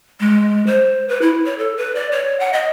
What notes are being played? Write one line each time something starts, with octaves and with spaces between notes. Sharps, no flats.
G#3
C5
B4
E4
C#5
A4
B4
D5
C#5
F#5
D#5